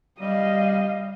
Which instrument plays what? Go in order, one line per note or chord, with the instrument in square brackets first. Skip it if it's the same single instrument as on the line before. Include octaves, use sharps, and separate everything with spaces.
[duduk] G3 [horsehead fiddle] D#5 F5